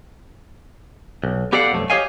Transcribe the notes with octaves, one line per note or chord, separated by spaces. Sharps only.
B1
B3 G4 A4 D5 F5 F#5
B1 F2 A3
G4 G#4 C#5 D#5 F5 G#5